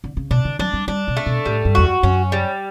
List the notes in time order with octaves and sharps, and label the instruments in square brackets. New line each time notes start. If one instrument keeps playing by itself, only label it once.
[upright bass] D3
C#3
[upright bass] B2 [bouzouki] D4
[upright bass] D3
[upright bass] F#3 [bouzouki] D4
[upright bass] G3
[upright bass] G3 [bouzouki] D4
[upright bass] B2
[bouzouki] A3
[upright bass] B2
[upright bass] A2 [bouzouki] G3
[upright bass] G2
[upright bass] E2 [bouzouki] F#4
[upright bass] F#2
[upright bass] F#2 [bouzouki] C#4
[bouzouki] G3